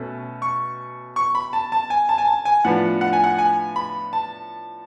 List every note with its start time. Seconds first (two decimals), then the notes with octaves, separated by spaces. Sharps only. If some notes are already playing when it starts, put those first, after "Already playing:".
Already playing: B2 A3 C#4
0.42 C#6
1.16 C#6
1.35 B5
1.53 A5
1.72 A5
1.90 G#5
2.09 A5
2.18 G#5
2.27 A5
2.45 G#5
2.65 A2 F3 B3 D4 F#5
3.01 F#5
3.13 G#5
3.24 F#5
3.38 G#5
3.76 B5
4.13 A5